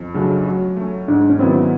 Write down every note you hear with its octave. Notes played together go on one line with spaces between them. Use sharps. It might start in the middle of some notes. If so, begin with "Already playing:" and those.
Already playing: F2
C#3 F#3 A3 D4
F#3
A3 C#4
G#2 D4
C#4
D#3 F#3 B3 C4 E4